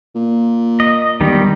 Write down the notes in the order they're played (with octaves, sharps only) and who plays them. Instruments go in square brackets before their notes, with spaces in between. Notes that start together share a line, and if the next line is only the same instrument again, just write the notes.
[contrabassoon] A#2
[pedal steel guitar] D#5
[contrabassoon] E1 [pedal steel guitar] D#3 G3